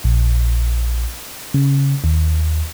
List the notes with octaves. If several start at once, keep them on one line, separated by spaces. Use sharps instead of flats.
A#1
C#3
D#2